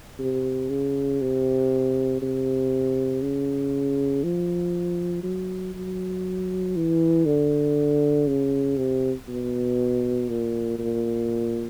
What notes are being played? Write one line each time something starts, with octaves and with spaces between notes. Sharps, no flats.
C3
C#3
C3
C3
C#3
F3
F#3
F#3
E3
D3
C#3
C3
B2
A#2
A#2